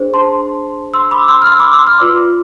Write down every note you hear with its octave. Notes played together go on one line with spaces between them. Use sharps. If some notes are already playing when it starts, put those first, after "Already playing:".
Already playing: D4 G#4 C5
A5 C6
C6 E6
B5 D6
C6 E6
F6
C6 E6
B5 D6
C6 E6
D6 F6
F4 B4 D5